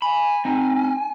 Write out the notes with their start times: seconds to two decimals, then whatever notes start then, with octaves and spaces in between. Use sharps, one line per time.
0.02 G#5 B5
0.45 C4 D#4